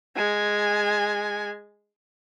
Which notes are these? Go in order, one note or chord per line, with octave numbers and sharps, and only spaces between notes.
G#3 G#5